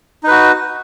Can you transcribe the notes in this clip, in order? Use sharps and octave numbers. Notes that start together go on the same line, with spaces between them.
D#4 F#4 B4